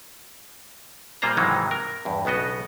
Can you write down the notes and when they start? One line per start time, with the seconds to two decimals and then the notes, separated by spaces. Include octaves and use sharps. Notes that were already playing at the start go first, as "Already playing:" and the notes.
1.22 A#2 G3 A#3 F4 C5 A#5
1.37 G#2 C3 D#3 E3 F#3 G#3
1.71 A#4
2.05 E2 G2
2.25 B1 C#3 B3 F#4 D#5